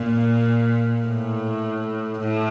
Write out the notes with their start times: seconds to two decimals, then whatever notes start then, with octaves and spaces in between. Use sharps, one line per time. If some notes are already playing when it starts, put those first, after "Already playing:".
Already playing: A#2
1.07 A2
2.19 A2